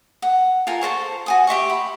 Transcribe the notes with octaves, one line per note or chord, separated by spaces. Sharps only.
F#5
F4 A4 A#4 G#5
A4 A#4 C5 C#6
F#4 G#5 D#6
G4 E5 C6 C#6
B5